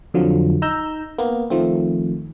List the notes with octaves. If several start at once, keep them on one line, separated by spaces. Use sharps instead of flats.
F2 D3 F3 F#3
D#4 A#5 E6 G6
A#3 B3
D#3 F3 A3 C4